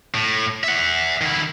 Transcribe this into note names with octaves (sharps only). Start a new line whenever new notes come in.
A2
E5 F#5
D#3 E4